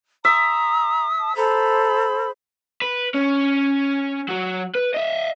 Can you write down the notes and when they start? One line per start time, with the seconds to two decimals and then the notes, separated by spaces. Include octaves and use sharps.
0.25 E5 A#5 C6 D#6
1.19 A5
1.37 A4 C5 A#5 B5
2.82 B4
3.14 C#4
4.29 F#3 F#4
4.75 B4
4.94 D#5 E5